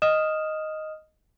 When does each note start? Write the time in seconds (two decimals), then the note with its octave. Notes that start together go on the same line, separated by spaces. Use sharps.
0.02 D#5 D#6 F6 E7